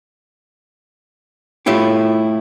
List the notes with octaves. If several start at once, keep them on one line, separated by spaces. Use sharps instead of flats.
A2 A3 E4 F4 G4